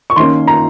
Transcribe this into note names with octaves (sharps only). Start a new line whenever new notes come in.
C#6
D#3 A#3 C#4 C6
A#5